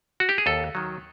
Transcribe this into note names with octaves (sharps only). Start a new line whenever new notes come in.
F#4
G4
G#4
D#2 A4
D#3 F#3